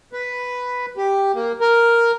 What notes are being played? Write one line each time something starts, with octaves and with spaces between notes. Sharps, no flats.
B4
G4
A#3
A#4